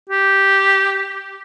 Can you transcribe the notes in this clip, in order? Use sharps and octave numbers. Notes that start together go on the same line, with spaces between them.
G4